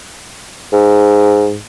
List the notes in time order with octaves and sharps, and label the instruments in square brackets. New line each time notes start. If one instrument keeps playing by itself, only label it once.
[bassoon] G#2